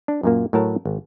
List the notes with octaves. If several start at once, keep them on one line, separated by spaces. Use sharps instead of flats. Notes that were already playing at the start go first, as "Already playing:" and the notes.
D4
F#2 A#2 A#3
A2 F#3 A#4 A5
G#1